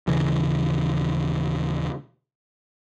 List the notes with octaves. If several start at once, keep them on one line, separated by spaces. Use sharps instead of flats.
D#1 C#3 E3